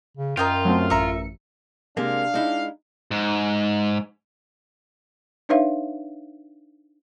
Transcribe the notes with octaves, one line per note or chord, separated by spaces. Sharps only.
C#3
F#2 F4 A#4 D#5 G5
F#3 A3 C4
A1 E5 A#5 C#7
C3 G#3 A#3 D4 F5
G#3 D#4 E4
G#2
D4 D#4 B4 C#5 E5 F5